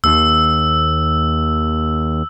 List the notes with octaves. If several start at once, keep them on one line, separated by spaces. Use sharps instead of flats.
D#2 E6